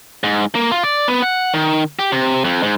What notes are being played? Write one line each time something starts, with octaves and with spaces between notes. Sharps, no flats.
G#2
A#3
F4
D5
B3
F#5
D#3
G4
C3
F2
G#2